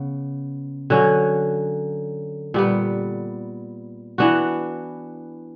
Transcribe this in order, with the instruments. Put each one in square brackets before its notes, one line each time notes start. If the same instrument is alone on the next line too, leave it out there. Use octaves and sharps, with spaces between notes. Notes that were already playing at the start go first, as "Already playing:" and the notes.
Already playing: [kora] C#3 B3
D3 F#3 C#4
A#2 G3 B3
E3 B3 D4 F#4